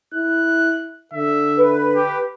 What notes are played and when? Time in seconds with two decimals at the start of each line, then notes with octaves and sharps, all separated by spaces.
0.14 E4 F#6
1.14 D3 E5
1.57 B4
1.95 G4